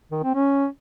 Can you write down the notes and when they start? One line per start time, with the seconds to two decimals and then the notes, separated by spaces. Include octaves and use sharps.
0.11 D#3
0.23 C4
0.35 C#4